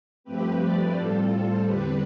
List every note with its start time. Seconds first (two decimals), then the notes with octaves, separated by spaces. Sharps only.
0.24 G2 F3 A3 C4 G4 B4
0.59 B4 D5
0.93 A2 G3 C4 F4 A4
1.63 E2 D3 G3 C4 G4 B4